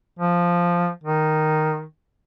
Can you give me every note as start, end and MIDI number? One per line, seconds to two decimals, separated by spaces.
0.19 0.89 53
1.04 1.83 51